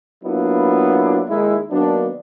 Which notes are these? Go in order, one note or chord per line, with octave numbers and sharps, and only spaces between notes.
F#3 A#3 B3 D4 E4 F4
D#2 G#3 D#4 E4
D#3 F#3 A#3 B3 D4